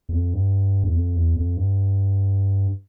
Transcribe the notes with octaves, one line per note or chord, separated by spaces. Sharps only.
E2
F2
G2
E2
F2
E2
F2
G2